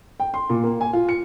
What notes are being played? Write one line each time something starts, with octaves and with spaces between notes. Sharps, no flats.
G5
C6
A#2
A#3
G#5
F4
C#7